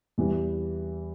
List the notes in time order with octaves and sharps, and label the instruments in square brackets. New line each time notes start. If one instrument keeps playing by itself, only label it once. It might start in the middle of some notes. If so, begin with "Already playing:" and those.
[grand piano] E2 E3 G3